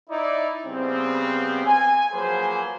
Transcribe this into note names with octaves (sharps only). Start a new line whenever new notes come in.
D#4 E4 D5
C#3 G3 B3 C4
G#5
F3 F#3 A#3 G#4 B4 C5